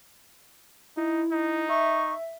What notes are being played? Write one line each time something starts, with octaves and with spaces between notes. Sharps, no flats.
D#4 E4
D#4
E5 C#6